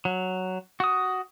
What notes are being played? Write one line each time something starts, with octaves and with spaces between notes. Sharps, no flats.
F#3
F#4 D#6